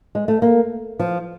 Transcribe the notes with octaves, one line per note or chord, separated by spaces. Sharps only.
G#3
A3
A#3
F3